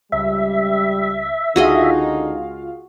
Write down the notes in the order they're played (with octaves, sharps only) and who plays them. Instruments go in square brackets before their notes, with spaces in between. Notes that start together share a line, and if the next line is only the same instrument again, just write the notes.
[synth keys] C#2 [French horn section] G3 [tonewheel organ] E5
[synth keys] C#2 F4 F5 [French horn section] D3 D#4 [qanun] F#4 G#4 D#5